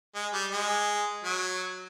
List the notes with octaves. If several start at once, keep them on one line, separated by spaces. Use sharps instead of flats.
G#3
G3
G#3
F#3